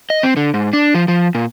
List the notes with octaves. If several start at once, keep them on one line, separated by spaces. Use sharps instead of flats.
D#5
C4
D3
G#2
D4
F3
F3
A#2